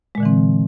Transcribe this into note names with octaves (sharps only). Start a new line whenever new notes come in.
A#2 D3 E3 G#3 C4